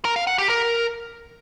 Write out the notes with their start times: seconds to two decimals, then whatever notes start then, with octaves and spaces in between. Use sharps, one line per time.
0.05 A#4
0.16 F5
0.27 F#5
0.38 G4
0.49 A#4